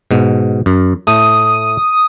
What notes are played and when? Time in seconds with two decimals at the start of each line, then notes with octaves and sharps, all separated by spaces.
0.11 G#2 B2
0.66 F#2
1.07 A2 A3 D#6